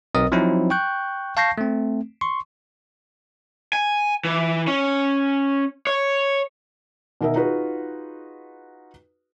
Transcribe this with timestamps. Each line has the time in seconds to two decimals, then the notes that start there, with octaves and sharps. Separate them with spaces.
0.15 B1 C4 A#4 D#5 D#6
0.32 F3 F#3 C4 D#4 E4
0.70 G5 C#6 F#6 G6
1.37 F5 A5 C#6 G6 A#6 C7
1.58 A3 C4
2.21 C6 C#6
3.73 G#5
4.25 E3
4.67 C#4
5.87 C#5
7.21 B2 D#3 A#4 D#5 E5
7.36 D#4 F4 F#4 G#4 B4